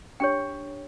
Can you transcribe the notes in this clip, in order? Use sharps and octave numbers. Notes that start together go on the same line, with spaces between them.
D4 G4 C#5 G5